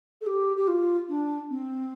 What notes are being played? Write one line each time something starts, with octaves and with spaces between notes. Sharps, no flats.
A4
G4
G4
F4
D4
C4